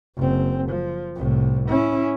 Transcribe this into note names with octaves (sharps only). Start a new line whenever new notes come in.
F#1 C4
F3
C2 A2
C#4 E4